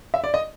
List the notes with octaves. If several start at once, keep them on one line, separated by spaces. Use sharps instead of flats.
E5
D5
D#5